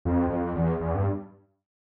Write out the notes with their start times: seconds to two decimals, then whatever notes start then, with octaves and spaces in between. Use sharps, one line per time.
0.05 F2
0.30 F2
0.56 E2
0.80 E2
0.95 G2